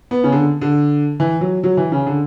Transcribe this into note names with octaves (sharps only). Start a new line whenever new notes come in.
B3
C#3
D3
D3
E3
F#3
F#3
E3
C#3
D3